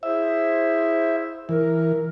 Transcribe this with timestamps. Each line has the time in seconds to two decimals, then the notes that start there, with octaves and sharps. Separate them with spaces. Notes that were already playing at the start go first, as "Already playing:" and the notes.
0.03 E4 G#4 C5 E5
1.49 E3 A#4